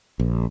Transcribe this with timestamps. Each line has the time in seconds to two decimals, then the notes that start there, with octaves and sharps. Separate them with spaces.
0.19 A#1